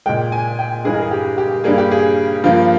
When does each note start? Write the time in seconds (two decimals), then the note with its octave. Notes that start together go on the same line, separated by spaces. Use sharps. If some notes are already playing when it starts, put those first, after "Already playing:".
0.06 A#2 G#3 G5
0.32 G#5
0.59 G5
0.85 G2 E3 G#3 G#4
0.94 A#4
1.02 G#4
1.11 G4
1.38 G4
1.64 G2 G3 A#3 G#4
1.78 G4
1.91 G#4
2.44 G2 F3 A#3 F4